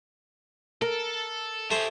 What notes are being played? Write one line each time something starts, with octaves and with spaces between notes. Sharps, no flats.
A4 A#4
A3 G4 G#4 C5